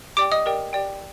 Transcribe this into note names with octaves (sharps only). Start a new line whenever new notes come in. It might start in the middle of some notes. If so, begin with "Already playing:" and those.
G4 D5 G5 D6 D7
D#5 D#6
G4 A#4 D5 G5
G4 D5 G5